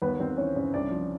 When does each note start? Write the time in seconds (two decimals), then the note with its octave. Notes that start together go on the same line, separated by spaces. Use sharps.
0.02 D#2 B3 B4
0.20 D#2 C4 C5
0.37 E3 C#4 C#5
0.56 C#3
0.73 C2 D4 D5
0.91 F3